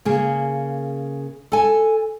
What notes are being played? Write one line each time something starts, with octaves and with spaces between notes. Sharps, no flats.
C#3 A#3 G#4
A4 G#5